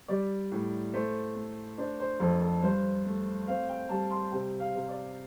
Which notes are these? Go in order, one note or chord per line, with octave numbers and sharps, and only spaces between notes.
G3 D5
A2
A3 C5
A3
D4 C5
C5
F2 A4
A4
G2 C5
A3
C4 F5
G5
G3 A5
C6
C3 G5
F5
C3
D5